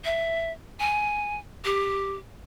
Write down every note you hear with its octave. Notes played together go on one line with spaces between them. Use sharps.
E5
G#5
G4